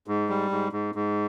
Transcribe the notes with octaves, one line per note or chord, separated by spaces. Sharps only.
G#2
G3
G#2
G#2
G#2